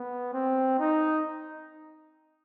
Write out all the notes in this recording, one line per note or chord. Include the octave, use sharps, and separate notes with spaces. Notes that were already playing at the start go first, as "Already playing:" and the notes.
Already playing: B3
C4
D#4